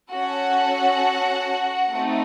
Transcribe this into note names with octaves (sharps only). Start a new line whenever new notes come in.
C#4 F#4 A4 F#5
A3 C4 D#4